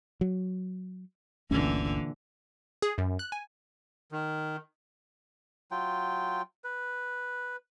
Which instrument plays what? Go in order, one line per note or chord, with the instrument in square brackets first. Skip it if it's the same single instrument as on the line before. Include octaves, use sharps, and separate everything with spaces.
[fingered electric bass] F#3
[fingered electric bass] G1 D2 C#4 [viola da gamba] A#2 D3 E3
[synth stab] G#4
F#2
F#6
G#5
[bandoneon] D#3
[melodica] F#3 F4 G5
B4